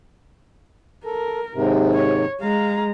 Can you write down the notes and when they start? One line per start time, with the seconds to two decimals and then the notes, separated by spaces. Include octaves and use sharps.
1.05 A4 A#4
1.55 D#2 G#2 C3
1.94 C#5
2.41 G#3 F5 A#5